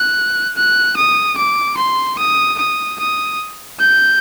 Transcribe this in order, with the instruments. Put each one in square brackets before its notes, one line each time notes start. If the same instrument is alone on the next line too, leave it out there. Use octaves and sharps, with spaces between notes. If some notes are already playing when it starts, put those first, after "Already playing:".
Already playing: [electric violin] F#6
F#6
D#6
D6
C6
D#6
D#6
D#6
G6